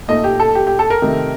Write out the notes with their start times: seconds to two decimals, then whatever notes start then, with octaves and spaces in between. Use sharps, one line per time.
0.08 A#2 A3 D#4 D#5
0.24 G4
0.40 A4
0.55 G4
0.67 G4
0.79 A4
0.90 A#4
1.02 C3 D#3 A3